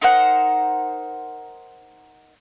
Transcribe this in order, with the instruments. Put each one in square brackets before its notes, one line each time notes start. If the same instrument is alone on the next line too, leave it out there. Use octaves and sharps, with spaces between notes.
[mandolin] D#4 A#4 C5 F#5